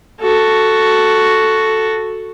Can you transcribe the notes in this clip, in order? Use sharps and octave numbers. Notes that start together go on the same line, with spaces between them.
F#4 A4